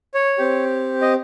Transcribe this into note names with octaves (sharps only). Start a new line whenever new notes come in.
C#5
C4 G4
D#5